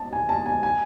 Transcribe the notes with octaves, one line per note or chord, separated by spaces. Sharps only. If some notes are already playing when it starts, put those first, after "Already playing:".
Already playing: A5
G#5
A5
G#5
G#5